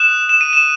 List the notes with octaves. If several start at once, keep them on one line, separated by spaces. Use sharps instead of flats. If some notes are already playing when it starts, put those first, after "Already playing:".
Already playing: D#6 F#6 E7
E7
D#7
E7